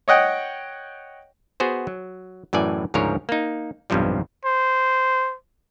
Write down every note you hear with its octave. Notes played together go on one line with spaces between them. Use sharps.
C#5 D#5 F#5 G5
B3 F#4 G#4 C5
F#3
F#2 A2 E3 D5 G#5
D2 G#2 C#3 F3 A#4 C#5
A#3 D#4
B1 E2 G2 C3 F3 G3
C5